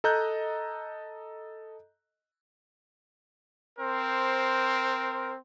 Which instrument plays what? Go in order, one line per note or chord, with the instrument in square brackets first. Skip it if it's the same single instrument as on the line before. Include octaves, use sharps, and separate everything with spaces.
[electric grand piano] A4 D#5 A#5 F#6 G6
[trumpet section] C4 A#4 C5